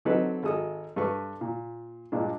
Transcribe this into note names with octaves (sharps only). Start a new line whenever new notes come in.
D3 F#3 C4 D#4 A4 B4
G#1 G#3 A4 D#6
G2 A4 B4 C#6
A#2
G2 A#2 G#3 D4